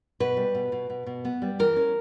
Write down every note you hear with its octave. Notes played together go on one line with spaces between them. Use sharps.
B2 B4
G3
B2
B2
B2
B2
B3
G3
E3 A#4
C#4